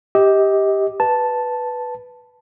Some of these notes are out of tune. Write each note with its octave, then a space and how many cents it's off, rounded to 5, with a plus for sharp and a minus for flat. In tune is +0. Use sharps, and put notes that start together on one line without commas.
G4 +0 D#5 +30
B4 +0 A5 +0